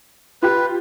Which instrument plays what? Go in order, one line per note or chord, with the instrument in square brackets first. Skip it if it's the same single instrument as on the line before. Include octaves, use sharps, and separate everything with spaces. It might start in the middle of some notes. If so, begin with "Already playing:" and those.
[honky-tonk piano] F4 G4 [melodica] B4